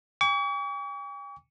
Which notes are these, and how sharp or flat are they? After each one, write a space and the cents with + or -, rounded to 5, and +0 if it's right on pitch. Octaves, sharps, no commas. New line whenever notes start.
G5 +45 C#6 +45